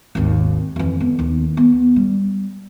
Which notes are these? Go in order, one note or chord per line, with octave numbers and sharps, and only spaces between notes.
G#1 D#2
F2 E3
D3 B3
D#2 D4
B3
G3